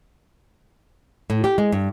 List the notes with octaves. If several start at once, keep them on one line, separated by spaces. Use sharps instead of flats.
A2
G4
G#3
G2